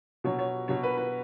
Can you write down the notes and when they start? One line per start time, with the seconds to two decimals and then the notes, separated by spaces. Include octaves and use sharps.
0.24 B2 F#3 C#5
0.39 C#5
0.68 B2 F#3 C#5
0.83 B4
0.97 B4